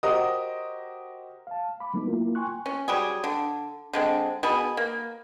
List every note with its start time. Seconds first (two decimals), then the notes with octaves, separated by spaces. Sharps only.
0.03 F#4 G4 A#4 C5 D#5 D#6
1.47 F5 A5
1.80 B5 D6
1.94 F#3 A3 B3 D#4
2.07 A#3 E4 F4 A#4
2.35 G5 G#5 C6 C#6 F#6
2.66 C#4
2.88 F#3 G3 G#4
3.24 D3
3.93 D3 G#3 C4
4.43 B2 G#4 B5
4.77 A#3